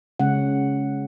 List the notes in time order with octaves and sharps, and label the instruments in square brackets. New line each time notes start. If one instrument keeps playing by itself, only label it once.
[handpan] C#3 G#3 C#4 F#5